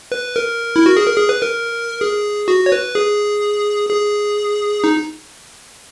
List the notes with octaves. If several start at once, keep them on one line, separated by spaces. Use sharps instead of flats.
B4
A#4
E4
F#4
G#4
A#4
G#4
B4
A#4
G#4
F#4
C#5
B4
G#4
G#4
D#4